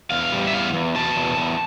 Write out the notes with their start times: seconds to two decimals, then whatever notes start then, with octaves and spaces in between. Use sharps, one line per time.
0.11 E2 F5
0.32 G3
0.47 E5
0.53 E2 F5
0.74 E2
0.95 B2 A5
1.16 E2
1.37 E2